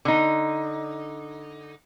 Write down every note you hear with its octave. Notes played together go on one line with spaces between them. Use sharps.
D3 D#4